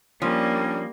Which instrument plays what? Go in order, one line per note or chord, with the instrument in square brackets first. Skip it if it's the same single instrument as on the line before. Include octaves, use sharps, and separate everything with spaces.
[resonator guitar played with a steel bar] F3 [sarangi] G3 [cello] A#3 [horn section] C#4 D4